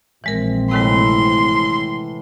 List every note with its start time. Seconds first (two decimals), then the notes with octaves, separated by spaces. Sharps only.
0.24 A#1 E3 G#3 C4 A#4
0.71 A2 C3 D#3 E3 G#3 C6